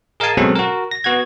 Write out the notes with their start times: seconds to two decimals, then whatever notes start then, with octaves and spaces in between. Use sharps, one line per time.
0.20 G#4 A#4 D#5 F5 G#5 A5
0.37 B2 F#3 G#3 C4 C#4 A4
0.55 F#4 A#4
0.91 A#6
1.04 B3 F#4 F#5 G#6